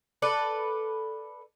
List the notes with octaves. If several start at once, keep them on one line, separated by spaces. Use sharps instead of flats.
A4 B4 D5